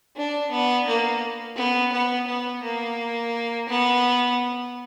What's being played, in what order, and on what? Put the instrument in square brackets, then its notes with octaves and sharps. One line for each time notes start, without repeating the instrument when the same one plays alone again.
[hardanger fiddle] D4
B3
A#3
B3
B3
B3
A#3
B3